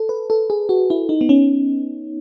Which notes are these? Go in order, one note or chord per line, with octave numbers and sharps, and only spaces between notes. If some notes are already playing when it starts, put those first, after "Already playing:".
Already playing: A4
B4
A4
G#4
F#4
E4
D#4
B3
C#4